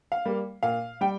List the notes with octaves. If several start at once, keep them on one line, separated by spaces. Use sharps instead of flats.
F5
G3 A#3
A#2 F5
G3 G5